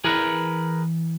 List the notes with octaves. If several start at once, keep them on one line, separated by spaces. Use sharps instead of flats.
E3 G#4 A#4 B4